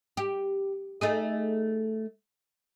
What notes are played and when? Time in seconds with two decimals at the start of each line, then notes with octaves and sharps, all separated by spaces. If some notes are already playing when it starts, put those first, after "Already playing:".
0.17 G4
1.01 A3 D#4 G#4